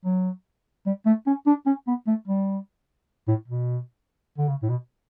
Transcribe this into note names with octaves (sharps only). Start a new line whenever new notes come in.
F#3
G3
A3
C#4
D4
C#4
B3
A3
G3
A2
B2
D3
C#3
A2
B2